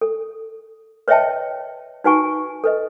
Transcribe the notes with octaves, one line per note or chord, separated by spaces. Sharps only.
A4
B4 C#5 D#5 E5 G5 A5
D#4 F#4 B4 F#5 G#5 C#6
A4 B4 D#5